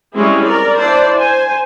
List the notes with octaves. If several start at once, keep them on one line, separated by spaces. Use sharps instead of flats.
G3 G#3 C4 C#4 E4 G#4
A#4 D5
D4 E4 C5 D5
C5 G#5